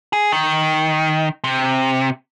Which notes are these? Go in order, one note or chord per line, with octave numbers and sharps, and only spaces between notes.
G#4
D#3
C3